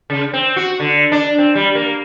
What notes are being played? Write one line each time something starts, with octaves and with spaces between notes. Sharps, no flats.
C#3
C4
F#4
D3
D4
C4
G3
A#3